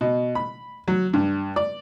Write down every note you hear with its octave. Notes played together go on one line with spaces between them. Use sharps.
B2
B5
F#3
G2
D5